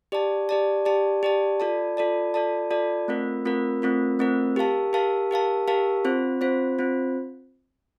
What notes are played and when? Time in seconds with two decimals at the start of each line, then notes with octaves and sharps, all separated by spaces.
0.12 G4 D5 A5
0.49 G4 D5 A5
0.85 G4 D5 A5
1.23 G4 D5 A5
1.60 F4 A4 D5 A5
1.97 F4 A4 D5 A5
2.34 F4 A4 D5 A5
2.71 F4 A4 D5 A5
3.08 A3 C4 F4 A#4
3.45 A3 C4 F4 A#4
3.82 A3 C4 F4 A#4
4.19 A3 C4 F4 A#4
4.56 G4 A#4 F5 A5
4.93 G4 A#4 F5 A5
5.31 G4 A#4 F5 A5
5.68 G4 A#4 F5 A5
6.05 C4 F4 C5
6.41 C4 F4 C5
6.79 C4 F4 C5